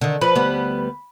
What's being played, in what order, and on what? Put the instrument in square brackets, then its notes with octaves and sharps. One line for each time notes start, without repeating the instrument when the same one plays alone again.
[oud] D3 D#3
[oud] F3 [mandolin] B4
[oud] D2 G3 B3